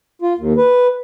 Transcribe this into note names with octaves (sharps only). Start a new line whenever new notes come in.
F4
D#2
B4